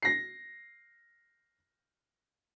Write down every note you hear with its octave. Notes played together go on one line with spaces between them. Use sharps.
A#6 C7